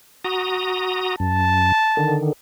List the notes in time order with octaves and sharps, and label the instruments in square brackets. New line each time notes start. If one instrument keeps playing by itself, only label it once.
[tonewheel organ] F#4 A#5 D#6
[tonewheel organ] F#2 [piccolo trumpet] A5
[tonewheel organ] D3 D#3